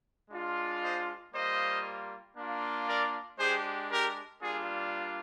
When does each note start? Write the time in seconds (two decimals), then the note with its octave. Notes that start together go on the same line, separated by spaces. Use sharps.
0.31 G#3 D4 F4
0.82 C5 D#5
1.33 G3 A#3 F4 C5 D#5
2.37 A#3 D4 F4
2.88 A#4 D5
3.38 G#3 D4 G4 G#4 C5
3.91 G4 A#4
4.42 G3 A#3 D4 F4 G#4